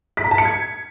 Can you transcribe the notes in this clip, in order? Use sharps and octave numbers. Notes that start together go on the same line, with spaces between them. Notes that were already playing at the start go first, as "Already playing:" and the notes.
B6
A#5
A5
C#7
G#6